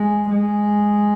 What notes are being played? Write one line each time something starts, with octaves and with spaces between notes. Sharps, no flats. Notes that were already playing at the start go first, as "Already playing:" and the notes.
Already playing: G#3
G#3